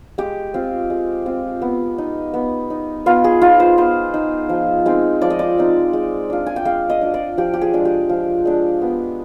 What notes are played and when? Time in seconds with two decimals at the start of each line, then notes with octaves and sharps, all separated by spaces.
0.18 G#3 G4
0.54 C4 F4
0.90 G#3
1.26 C4 F4
1.62 B3
1.98 D#4
2.34 B3
2.70 D#4
3.06 B3 F4
3.24 G#4
3.41 D#4 F4
3.60 C5
3.78 B3 C5
4.14 D#4
4.49 F3
4.86 G#3 C4 D#4
5.22 F3 D5
5.30 D#5
5.39 D5
5.58 G#3 C4 D#4
5.93 G#3
6.30 D4 F4
6.46 G#5
6.56 G5
6.65 G#3 F5
6.90 D#5
7.01 D4 F4
7.14 D5
7.37 F3 G4
7.54 G4
7.61 G#4
7.74 G#3 D4
7.85 G4
8.09 F3
8.45 G#3 D4
8.82 B3